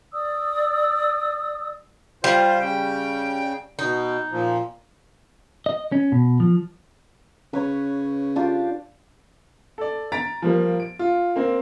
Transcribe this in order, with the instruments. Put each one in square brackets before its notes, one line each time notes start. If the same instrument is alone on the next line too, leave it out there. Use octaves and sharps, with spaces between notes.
[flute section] D5 D#6 E6
[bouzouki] G3 [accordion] F4 C5
[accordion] C#3 G5
[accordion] B2 [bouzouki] D#4
[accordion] A#2 F3
[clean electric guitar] D#5
C#4
B2
F3
[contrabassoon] C#3 [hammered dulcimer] B4 C#5
[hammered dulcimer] D4 F4 G4
[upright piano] A4 D5
A#5 A6 B6 D7
F3 G3 A#3
D7
F4
A#3 C4